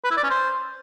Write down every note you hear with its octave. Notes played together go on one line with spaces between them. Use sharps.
B4
E4
D5
C#4
C5